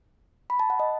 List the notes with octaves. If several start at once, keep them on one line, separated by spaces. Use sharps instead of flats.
B5
A5
F#5
D#5